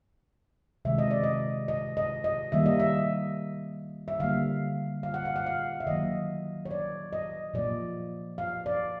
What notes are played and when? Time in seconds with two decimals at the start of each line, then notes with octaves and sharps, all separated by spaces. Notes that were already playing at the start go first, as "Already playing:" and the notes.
0.85 C3 D#3 G#3 E5
0.98 D#5
1.11 D5
1.23 D#5
1.68 D#5
1.97 D#5
2.24 D#5
2.52 D#3 G3 A#3 E5
2.66 D#5
2.80 E5
4.08 E5
4.20 D3 G3 A#3 F5
5.03 F5
5.14 F#5
5.25 F5
5.36 F#5
5.46 F5
5.80 E5
5.87 D#3 F#3 A#3 D#5
6.65 C#5
6.71 D5
7.13 D#5
7.54 A#2 F3 A#3 D5
8.38 F5
8.66 D5